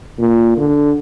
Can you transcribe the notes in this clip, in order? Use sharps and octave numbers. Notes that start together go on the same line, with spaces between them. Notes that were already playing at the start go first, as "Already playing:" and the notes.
A#2
D3